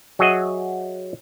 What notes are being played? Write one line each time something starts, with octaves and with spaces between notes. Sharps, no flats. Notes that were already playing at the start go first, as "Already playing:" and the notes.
F#3 F#4 G#4 D#5 E5 F#5